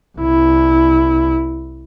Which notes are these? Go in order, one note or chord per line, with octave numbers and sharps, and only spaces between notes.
C2 E4